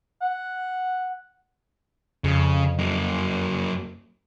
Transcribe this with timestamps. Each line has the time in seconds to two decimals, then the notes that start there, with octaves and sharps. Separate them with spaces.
0.22 F#5
2.24 F2 C#3
2.79 F#2 A#3